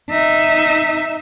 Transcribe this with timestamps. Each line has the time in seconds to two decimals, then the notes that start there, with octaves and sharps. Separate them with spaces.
0.11 D#4 E5